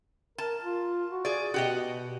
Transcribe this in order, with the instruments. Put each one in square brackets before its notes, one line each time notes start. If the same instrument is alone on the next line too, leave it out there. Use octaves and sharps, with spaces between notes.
[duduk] A#4 [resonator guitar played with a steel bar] A5
[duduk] F4
F#4
[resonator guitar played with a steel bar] G#4 D5
[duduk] B2 [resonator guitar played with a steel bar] F#4 G4 D#5